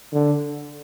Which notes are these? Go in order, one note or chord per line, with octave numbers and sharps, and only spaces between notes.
D3